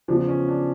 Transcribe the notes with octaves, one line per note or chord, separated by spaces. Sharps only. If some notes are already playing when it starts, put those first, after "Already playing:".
E2 C#3 F3 D4
C#4
D4